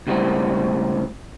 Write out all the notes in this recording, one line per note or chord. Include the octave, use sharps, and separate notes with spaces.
C#2 A2 G3 B3 C4